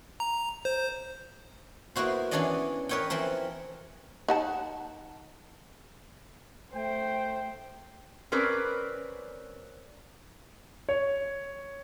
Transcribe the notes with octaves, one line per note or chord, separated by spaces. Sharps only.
A#5
C5
A#3 B3 E4 F#4 C5
E3 C#4 D4 G#4 D5 D#5
A#4 B4 C#5 D#5 G5
E3 F3 C4 A#4
D#4 F#5 A5
A3 C5 G5
C4 C#4 A#4 B4 D5
C#5